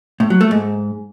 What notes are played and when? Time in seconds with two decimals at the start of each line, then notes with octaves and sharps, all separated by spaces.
0.20 A2
0.30 F#3
0.41 A3
0.51 G#2